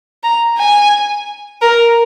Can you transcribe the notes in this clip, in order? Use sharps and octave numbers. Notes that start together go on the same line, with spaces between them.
A#5
G#5
A#4